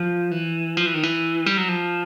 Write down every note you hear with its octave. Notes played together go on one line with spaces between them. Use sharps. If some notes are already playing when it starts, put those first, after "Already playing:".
Already playing: F3
E3
F3
E3
D#3
E3
G3
F#3
F3